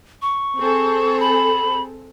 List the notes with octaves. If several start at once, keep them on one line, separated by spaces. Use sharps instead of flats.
C#6
C4 G#4 A4
B5